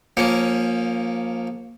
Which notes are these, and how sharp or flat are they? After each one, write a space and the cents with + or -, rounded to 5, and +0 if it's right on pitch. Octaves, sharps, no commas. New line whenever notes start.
F3 +25 A#3 +0 C#4 +0